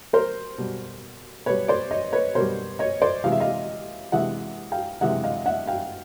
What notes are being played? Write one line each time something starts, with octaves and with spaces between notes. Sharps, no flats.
A#4 C5
B2 G3
B2 G3 B4 C#5
C5 D5
C#5 D#5
B4 C#5
B2 G3 A#4 C5
C#5 D#5
C5 D5
C3 E3 G#3 F5
E5
D#5 F5
C3 E3 G#3 E5 F#5
F5 G5
C3 E3 G#3 E5 F#5
D#5 F5
E5 F#5
F5 G5